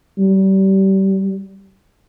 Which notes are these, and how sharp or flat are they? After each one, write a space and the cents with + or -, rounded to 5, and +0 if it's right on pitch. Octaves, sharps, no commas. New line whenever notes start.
G3 -30